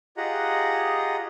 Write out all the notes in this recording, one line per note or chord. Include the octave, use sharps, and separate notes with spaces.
F4 G4 G#4 D#5 F#5 A#5